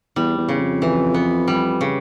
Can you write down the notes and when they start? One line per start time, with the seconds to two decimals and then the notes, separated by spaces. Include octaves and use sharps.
0.16 E2 G3
0.38 E2
0.49 C#3
0.59 F2
0.82 E3
1.14 B3
1.48 G3
1.81 C#3